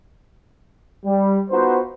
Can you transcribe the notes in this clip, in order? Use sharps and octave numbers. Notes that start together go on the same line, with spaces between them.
G3
B3 D#4 F4 F#4 B4 C5